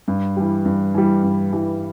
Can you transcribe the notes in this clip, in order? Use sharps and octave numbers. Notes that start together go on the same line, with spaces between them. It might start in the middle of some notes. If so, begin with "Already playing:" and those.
G2
E3 G3
G2
E3 G3
G2
E3 G3